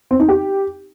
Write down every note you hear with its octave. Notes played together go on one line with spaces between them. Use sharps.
C4
D#4
G4